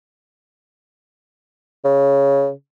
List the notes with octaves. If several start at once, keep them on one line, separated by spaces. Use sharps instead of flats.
C#3